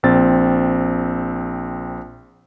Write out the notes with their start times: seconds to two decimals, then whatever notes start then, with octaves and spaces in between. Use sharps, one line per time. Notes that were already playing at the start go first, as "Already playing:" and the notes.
0.03 A#1 C4 A6